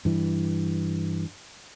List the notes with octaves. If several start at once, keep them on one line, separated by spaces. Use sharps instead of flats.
G2 E3